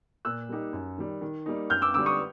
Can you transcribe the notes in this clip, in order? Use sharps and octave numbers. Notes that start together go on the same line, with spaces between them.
A#2 E6 F#6
G3 A#3 D#4 G4
F#2
D#3 G3
D#3
G3 A#3 D#4
F#2 F6 G6
D6 E6
D3 G3 D6 E6
C#6 D#6